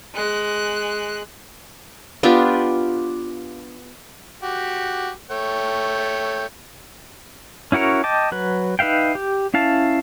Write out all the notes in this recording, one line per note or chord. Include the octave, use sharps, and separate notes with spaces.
G#3 F#6
B3 D4 F4 G4
F#4 G4
A3 C#5 G5
C#4 E4 F#4 A#4 C#5
D#5 G5 A5 D6
F#3 B4
D#4 B4 E5 F5 G5
G4
C#4 E4 F5 A5